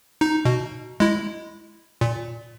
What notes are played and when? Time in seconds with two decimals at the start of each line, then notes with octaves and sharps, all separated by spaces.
0.21 D#4
0.45 B2
1.00 G#3 E4
2.01 A#2